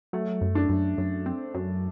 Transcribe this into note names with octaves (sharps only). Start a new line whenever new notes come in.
F#3 A3
F#2
D4
F#2
F#2
C4
F#2